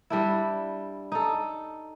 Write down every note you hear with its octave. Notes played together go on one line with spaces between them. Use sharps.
G3 D4 E4
D#4 A4